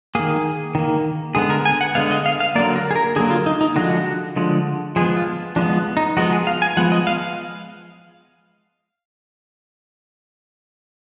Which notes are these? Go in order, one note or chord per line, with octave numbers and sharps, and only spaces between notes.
D#3 A#3 G#4
D#3 A#3
D3 G#3 B3 G#4
A#4
G#5
F#5
D3 G#3 B3 F5
D#5
F5
F5
D3 F#3 A#3 D5
A#4
G#4
A#4
D3 F#3 A#3 G#4
F4
D#4
D#4
D3 F3 G#3 F#4
D3 F3 G#3
F3 G#3 B3 G#4
F4
F3 G#3 B3 D4
D#4
F3 G#3 B3 F#4
G#4
F5
G#5
F3 G#3 B3 F#5
D#5
F5